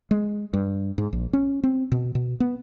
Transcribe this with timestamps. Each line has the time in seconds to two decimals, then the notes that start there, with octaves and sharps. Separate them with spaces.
0.11 G#3
0.53 G2
0.98 G#2
1.13 A#1
1.33 C#4
1.63 C4
1.92 B2
2.15 B2
2.40 B3